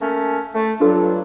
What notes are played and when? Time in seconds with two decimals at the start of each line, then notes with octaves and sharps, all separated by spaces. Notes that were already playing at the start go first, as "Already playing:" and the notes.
0.01 A3 A#3 C#4
0.55 A3
0.80 G2 F#3 D4 F4 A4